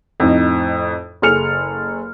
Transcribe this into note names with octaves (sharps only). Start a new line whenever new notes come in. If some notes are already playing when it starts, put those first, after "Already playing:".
F2 A2 D#4
F#1 G#4 A4 F6 C#7 F7